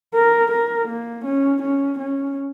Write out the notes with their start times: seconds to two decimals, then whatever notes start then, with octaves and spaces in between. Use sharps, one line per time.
0.14 A#4
0.51 A#4
0.88 A#3
1.25 C#4
1.62 C#4
1.99 C#4